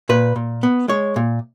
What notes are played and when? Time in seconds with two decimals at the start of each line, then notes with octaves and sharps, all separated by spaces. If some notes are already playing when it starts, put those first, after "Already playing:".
0.09 A#2 B4
0.36 A#2
0.63 B3
0.88 G#3 C#5
1.16 A#2